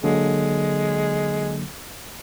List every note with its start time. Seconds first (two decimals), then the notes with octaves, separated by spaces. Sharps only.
0.04 D3 F#3 G#3 A#3